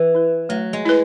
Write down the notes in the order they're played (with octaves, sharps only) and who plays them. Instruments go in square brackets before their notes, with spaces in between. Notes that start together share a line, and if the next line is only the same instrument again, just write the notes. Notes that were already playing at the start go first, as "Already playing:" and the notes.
Already playing: [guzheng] E3
[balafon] E4 B4
[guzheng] F#3 [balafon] A3
[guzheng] G#3
[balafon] E4 B4